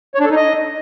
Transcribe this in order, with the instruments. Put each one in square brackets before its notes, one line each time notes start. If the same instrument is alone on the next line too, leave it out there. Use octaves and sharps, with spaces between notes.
[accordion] C#5
D4
A4
D#4
D#5